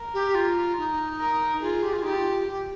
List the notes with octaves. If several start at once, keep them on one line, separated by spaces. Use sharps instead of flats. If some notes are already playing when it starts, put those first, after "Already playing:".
Already playing: A#4
G4
F4
D#4
A#4
F4 G#4
G4
F4
D#4 G4
F4
G4